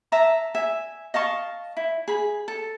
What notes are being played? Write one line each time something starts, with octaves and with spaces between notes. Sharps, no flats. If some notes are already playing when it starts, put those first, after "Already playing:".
E5 A5 A#5
E5 G#5
D#5 F5 A5 C#6
E4
G#4 B5
A4